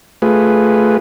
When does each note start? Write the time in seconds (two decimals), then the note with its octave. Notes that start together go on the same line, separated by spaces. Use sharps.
0.22 A3 F4 G#4 B4